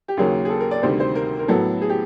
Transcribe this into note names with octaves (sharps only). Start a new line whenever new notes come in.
G4
D#2 C#3 F#3 A#3 C#4 G#4
G#4
A4
A#4
D5
D2 C3 D#3 G3 C5
C5
A#4
A#4
A2 F#3 B3 A4
G#4
G4